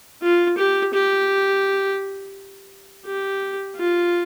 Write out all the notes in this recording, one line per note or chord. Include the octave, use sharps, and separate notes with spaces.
F4
G4
G4
G4
F4